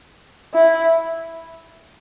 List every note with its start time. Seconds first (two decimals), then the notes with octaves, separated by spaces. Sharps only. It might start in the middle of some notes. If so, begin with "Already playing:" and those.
0.54 E4